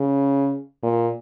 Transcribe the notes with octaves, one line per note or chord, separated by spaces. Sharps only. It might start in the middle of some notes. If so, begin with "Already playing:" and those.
Already playing: C#3
A#2